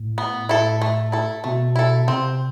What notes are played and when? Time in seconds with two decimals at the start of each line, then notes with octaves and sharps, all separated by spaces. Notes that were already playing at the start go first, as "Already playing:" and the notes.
Already playing: A2
0.18 B3
0.49 E4 A4
0.82 A3
1.12 E4 A4
1.44 B2 A3
1.76 E4 A4
2.08 C3 C4